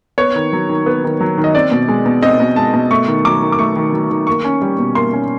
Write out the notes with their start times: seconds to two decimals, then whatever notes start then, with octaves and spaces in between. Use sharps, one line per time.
0.18 B3 C#5
0.36 D#3
0.53 F#3
0.69 D#3
0.86 B3
1.04 D#3
1.21 F#3
1.38 D#3
1.44 D#5
1.55 C4 D5
1.71 B2
1.88 G#3
2.06 B2
2.22 C4 D#5
2.40 B2
2.56 G#3 A5
2.74 B2
2.91 A3 C#6
3.07 D#3
3.25 F#3 D6
3.42 D#3
3.52 D6
3.59 A3 C#6
3.76 D#3
3.93 F#3
4.10 D#3
4.27 A#3 C#6
4.44 C#4
4.62 G3
4.79 B2
4.95 A#3 C6
5.13 C#4